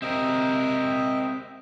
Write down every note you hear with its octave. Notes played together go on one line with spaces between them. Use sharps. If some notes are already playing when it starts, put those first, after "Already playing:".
C3 C4 A#4 D#5 E5